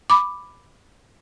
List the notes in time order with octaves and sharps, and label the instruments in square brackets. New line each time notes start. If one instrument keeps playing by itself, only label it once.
[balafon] B5 D6